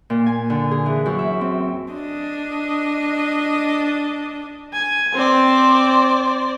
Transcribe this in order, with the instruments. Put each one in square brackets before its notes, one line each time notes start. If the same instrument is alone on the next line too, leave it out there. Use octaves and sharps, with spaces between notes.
[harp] A#2
G#5
D3
G#4
E3
F#2
E5
C4
[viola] D4 D#5
[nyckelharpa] G#5
[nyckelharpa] C4 [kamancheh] C5 D5